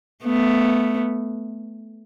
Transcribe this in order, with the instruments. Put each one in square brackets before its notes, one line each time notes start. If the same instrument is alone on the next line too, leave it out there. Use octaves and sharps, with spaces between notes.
[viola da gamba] A3 B3